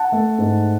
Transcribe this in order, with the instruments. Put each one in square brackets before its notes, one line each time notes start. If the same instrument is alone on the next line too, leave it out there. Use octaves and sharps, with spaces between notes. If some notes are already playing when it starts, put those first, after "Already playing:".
Already playing: [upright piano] F#5 A5
A3
G#2